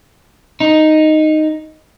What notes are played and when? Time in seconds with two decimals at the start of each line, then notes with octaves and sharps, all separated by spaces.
0.60 D#4